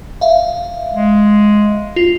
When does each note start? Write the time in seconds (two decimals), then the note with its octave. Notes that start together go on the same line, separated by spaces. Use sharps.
0.21 E5 F5
0.93 G#3
1.96 F4